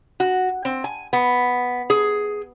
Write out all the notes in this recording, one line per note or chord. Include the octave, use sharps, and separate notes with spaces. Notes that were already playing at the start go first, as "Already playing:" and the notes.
F#4
C4
G#5
B3
G#4